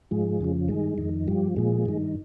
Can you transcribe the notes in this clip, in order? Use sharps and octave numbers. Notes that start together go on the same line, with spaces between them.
G#2 F3 G#3
F2 C#3 F3
G2 D#3 G#3
F2 D#3
G2 F3 G3
A#2 F3 G#3
G2 D#3